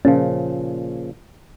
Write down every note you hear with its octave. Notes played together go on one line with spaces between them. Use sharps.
A#2 C#3 F3 C#4